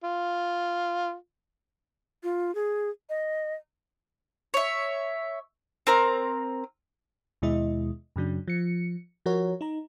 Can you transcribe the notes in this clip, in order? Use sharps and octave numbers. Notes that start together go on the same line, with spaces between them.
F4
F4
G#4
D#5
C#5 E5
C4 A#4 A#5
D#2 B2 G#3 E4 D#5
F#2 C#3 F#3 D4
F3 C#7
F3 F#4 A#4 C#5
D#4 A#5